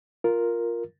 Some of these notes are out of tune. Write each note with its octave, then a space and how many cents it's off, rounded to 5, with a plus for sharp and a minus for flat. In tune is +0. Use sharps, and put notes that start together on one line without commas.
F4 +0 A#4 +0